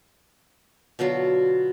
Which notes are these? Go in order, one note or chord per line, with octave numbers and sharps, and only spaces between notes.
B2 D3 F#3 F4